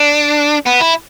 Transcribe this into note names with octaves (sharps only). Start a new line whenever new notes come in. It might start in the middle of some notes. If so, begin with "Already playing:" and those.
Already playing: D4
B3
E4